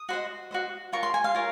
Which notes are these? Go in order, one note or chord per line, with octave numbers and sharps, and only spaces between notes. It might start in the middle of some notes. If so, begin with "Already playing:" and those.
Already playing: D#6
F#4 C5 D#5
F#4 C5 D#5
F4 A#4 C#5 C#6
C6
G#5
F5
F4 A#4 C#5